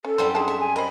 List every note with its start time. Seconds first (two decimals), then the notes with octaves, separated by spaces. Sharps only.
0.05 C#4 A4
0.18 F#2 G3 C4 E4 C5
0.35 D4 D#4 G#4 A5
0.48 A4 E5
0.60 G#5
0.76 A#4 C5 D#5 B5